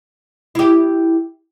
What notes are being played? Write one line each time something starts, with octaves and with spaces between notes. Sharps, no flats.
E4 G4